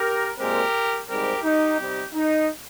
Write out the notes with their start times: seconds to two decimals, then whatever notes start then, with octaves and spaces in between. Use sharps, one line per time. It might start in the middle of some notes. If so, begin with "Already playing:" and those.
Already playing: G4 A#4
0.38 A#2 G#3 C4 G4 A#4
1.08 G#2 G3 C4 G4 A#4
1.43 D#4 G4
1.78 C3 G3 C4 D#4
2.14 D#4